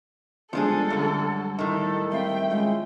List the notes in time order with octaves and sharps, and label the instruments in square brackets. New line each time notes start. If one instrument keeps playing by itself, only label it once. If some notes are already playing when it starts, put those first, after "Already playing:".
[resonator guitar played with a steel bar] F3 D4 G#4 [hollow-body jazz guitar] G3 G#3 B3 [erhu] A4
[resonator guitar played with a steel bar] F#2 D3
[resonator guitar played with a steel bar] A2 D#3 [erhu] A4
[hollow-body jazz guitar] G3 C4 F5 [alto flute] E5 [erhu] G5
[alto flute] G#3 [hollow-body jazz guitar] C#4 E4 F4